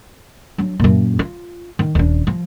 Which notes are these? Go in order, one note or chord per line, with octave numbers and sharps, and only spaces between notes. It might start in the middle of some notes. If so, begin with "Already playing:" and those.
F#3 D4
F#2 A#2
F4
D#3
D#1 D4
F3